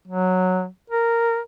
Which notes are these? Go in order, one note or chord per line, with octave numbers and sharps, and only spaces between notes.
F#3
A#4